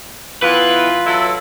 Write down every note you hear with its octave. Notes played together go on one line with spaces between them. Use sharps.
E3 B3 F4 B4
F#3 E4 A4